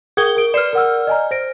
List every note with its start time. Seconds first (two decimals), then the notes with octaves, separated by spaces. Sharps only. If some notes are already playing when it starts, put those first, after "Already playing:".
0.17 G#4 A#4 G5 D#6 G#6 G7
0.36 A#4 D7
0.54 B4 D5 F6 C7 E7
0.73 A#4 F#5 E6
1.07 D#5 G#5 A#5
1.31 C5 A#6 D7